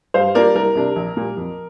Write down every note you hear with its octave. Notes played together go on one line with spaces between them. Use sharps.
G2 C5 F5
G3 A#3 D4 F4 A#4 D5
C2 A#4
C3 G3 D4
A#1
A#2 G3 A#3
F2